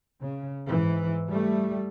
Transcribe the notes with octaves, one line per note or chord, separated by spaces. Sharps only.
C#3
G#2 E3
G3 A3